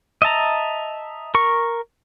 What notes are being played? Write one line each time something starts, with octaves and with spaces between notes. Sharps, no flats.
D#5 E5 A5 A#5
A#4 C#6